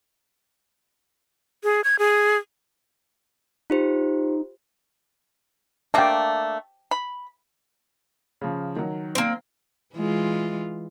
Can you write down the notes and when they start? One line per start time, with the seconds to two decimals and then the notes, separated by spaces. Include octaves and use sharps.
1.64 G#4
1.84 G#6
1.99 G#4
3.70 D#4 F4 G4 C5
5.94 A3 A#3 D4 G5 A5
6.91 B5
8.41 C#3 F3
8.76 D#3 F#3
9.15 A#3 C4
9.95 E3 G#3 F4